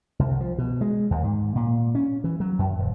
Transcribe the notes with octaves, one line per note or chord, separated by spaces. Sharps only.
C2
F3
B2
G#3
D#2
G#2
A#2
C#4
E3
F#3
F#2
D#1